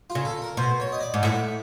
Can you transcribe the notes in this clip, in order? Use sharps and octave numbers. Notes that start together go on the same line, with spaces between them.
F4
C#3
A4
A#4
B2 C5
C#5
D#5
D5
G#2
A2 E5